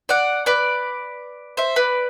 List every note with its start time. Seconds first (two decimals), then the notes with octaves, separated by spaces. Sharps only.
0.09 D5 F#5
0.46 B4 D5
1.57 C5 E5
1.76 B4 D5